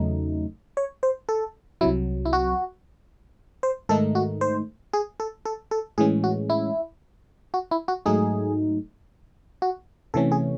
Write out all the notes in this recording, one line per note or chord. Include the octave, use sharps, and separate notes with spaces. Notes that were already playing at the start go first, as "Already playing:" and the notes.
Already playing: E2 C#3 F#3 A3 D#4
C#5
C5
A4
C2 C3 F#3 E4
E4
F#4
C5
G#2 D#3 A3 D#4 A4
F#4
C5
G#4
A4
A4
A4
A2 E3 G#3 C#4 G#4
F#4
E4
F#4
E4
F#4
G#2 F#3 A3 D#4 G#4
F#4
C3 E3 A3 C#4 A4
G#4